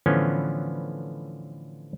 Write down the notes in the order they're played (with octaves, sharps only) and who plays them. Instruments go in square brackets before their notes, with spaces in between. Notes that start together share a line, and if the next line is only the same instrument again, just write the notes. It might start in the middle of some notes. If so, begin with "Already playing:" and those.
[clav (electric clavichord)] A2 D3 E3 F3 B3 C#4